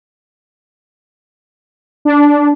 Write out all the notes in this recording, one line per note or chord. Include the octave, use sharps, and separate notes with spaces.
D4